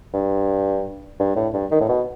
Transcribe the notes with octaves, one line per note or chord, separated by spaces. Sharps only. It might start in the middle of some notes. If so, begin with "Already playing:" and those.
G2
G2
A2
G2
D#3
A2
B2